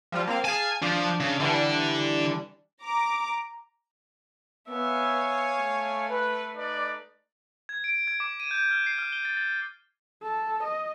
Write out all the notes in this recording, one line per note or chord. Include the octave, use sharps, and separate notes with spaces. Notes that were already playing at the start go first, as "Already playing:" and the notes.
F3 G3 F4
A#3 C4 F5
G#4 F5 G#5 A5
F3 D4
C#3
D3 E3 G3 D4
A#5 D6
B3 C#5 E5 F5 G#5
A3
B4
D#4 B4 D5
G#6
D7
G#6
D6
D#7
G6
F6
C7
F6
G7
A6
A6
A4
D#5